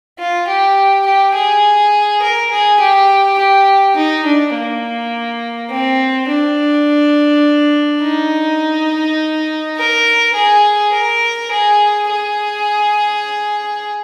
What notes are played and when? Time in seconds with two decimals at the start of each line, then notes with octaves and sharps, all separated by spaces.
0.19 F4
0.48 G4
1.06 G4
1.35 G#4
2.22 A#4
2.51 G#4
2.80 G4
3.38 G4
3.96 D#4
4.25 D4
4.54 A#3
5.71 C4
6.28 D4
8.03 D#4
9.77 A#4
10.35 G#4
10.93 A#4
11.51 G#4
12.09 G#4